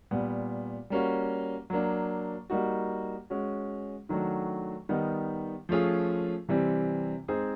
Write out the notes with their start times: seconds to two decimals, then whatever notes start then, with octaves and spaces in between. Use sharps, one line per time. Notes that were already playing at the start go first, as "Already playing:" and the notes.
0.11 A#2 G3 B3
0.90 G3 A#3 C#4 F#4
1.70 F#3 A#3 D4
2.50 G3 A#3 D#4 F#4
3.30 G#3 C#4 F#4
4.09 D#3 F#3 A3 D4 F#4
4.89 D#3 G3 B3 D#4
5.69 F3 A3 C#4 F4 G#4
6.49 C3 E3 G3 C4
7.28 G#3 C4 D#4 G#4 C5